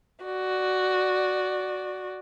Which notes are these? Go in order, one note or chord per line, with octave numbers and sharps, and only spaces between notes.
F#4 D5